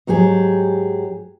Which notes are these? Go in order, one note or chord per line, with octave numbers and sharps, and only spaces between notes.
G#2 F#3 G4 G#4